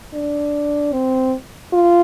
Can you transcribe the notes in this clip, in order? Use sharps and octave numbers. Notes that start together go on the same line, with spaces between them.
D4
C4
F4